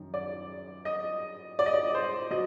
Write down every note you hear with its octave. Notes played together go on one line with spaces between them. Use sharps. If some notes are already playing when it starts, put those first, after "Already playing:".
Already playing: F#2 D#3
D5
D#5
D5
D#5
D5
C5
F#3 D#5